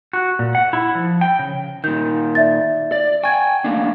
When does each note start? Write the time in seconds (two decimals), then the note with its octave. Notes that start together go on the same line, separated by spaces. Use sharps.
0.13 F#4
0.39 A#2
0.55 F#5
0.73 E4
0.95 F3
1.21 G5
1.39 C#3
1.84 A#2 D#3 G6
2.35 D5 E5 A6
2.92 D5
3.23 G5 G#5 C#6 G#6
3.64 A3 A#3 D4